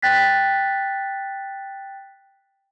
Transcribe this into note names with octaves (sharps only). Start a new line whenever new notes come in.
G5 F#6 A6 B6